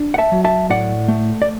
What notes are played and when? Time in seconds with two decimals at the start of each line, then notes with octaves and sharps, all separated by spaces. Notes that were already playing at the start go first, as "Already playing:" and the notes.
Already playing: D4
0.14 F#5
0.18 E5 A5
0.32 F#3
0.44 E5 A5
0.70 A2 D5 F#5
1.08 A3
1.42 D5